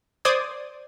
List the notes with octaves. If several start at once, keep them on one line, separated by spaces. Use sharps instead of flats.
C5 D5 D#6 G#6